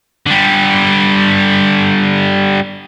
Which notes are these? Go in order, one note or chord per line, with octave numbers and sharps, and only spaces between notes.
D3 G3